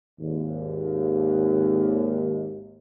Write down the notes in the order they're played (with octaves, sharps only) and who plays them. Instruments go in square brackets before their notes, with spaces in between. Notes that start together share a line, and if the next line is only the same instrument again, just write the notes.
[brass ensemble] G#1 D#2